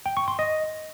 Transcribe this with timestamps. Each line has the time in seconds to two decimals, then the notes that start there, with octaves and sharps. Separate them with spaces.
0.06 G5
0.17 C#6
0.28 C6
0.39 D#5